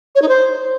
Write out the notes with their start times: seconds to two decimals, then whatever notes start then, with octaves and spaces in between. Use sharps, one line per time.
0.15 C#5
0.22 D#4
0.28 C5